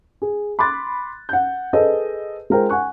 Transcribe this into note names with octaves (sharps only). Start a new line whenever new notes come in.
G#4
B5 C6 D6 F#6 A6
F#5 G6
G#4 A4 B4 C5 D#5
G#3 F4 A#4 C5 G5
F#5 G#5 C#6 F#6